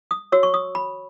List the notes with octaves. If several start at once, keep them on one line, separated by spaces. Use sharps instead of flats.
D#6
F#4 C#5 E6
C#6
D#6
B5